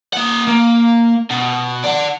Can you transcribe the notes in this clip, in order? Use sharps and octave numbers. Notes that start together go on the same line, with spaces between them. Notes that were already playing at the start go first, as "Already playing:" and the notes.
A#3 F#5
A#3
B2
D5 F#5